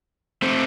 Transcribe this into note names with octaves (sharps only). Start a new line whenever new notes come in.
A3 C4